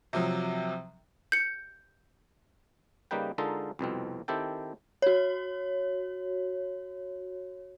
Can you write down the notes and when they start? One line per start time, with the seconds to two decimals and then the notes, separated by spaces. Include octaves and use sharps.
0.13 C3 F3 F#3
1.32 G6 C#7
3.11 C#3 G3 A#3 D#4 B4 G5
3.38 D3 G#3 D#4 F4 A4 A#4
3.79 C2 F2 B2 C4
4.28 D#3 C4 E4 G4 A4 G5
5.02 F#4 C#5